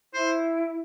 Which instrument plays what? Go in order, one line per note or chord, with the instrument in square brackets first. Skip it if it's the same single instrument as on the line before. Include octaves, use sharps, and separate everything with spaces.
[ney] E4 [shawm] C5